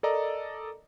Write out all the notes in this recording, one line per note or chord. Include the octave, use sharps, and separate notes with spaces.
A4 A#4 D5 D#5 A#5